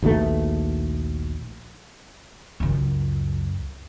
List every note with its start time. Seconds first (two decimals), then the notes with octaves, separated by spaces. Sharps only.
0.02 A#1 D#2 B2 A3
2.60 C#2 F#2